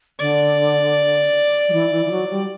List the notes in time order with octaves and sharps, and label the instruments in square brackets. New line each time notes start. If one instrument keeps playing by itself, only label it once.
[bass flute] D3 [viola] D5
[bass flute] F#3
E3
E3
E3
F#3
G3